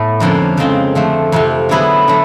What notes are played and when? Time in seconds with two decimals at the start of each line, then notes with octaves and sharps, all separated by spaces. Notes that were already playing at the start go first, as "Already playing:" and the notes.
Already playing: A2 A3 B3
0.20 F2 D3 F3 A#3 C#4
0.57 C#3 F3 G#3 C4 F4
0.95 D3 F3 A3
1.32 F2 C3 F3
1.69 D3 F#3 B3 E4 G#4
2.08 D3 F#3 A3